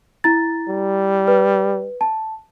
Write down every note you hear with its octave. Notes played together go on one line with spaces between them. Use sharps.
E4 A#5 A6
G3
B4
A5